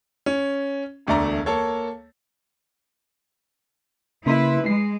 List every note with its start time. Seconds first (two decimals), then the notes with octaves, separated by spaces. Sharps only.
0.26 C#4
1.07 E1 D2 A3 D5 A#5
1.46 A#3 A4 C#5
4.26 C#3 A#3 E4 B4 C6
4.66 G#3 C7